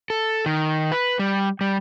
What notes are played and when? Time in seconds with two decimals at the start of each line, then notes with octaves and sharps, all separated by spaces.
0.10 A4
0.46 D#3
0.92 B4
1.19 G3
1.61 G3